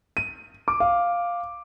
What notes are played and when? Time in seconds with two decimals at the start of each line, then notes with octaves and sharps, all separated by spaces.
0.17 D#7
0.68 D6
0.80 F5